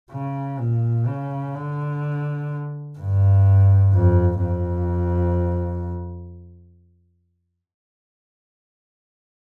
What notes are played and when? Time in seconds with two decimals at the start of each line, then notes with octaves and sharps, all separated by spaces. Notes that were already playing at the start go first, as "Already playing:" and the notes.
0.11 C#3
0.59 A#2
1.07 C#3
1.54 D3
2.98 G2
3.93 F2
4.42 F2